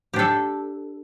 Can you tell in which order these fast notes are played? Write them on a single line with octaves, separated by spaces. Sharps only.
G4 D4 A4